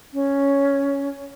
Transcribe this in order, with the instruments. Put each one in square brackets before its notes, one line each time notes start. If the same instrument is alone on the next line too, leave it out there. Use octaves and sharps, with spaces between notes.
[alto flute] C#4